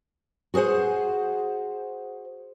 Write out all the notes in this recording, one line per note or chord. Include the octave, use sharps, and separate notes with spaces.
F#4 G#4 B4 C5 F#5